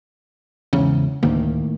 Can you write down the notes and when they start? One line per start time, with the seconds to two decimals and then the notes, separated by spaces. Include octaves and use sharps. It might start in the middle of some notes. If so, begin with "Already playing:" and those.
0.73 E2 G#2 C#3
1.23 D2 A2 D#3 A#3